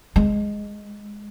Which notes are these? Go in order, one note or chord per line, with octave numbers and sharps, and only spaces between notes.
G#3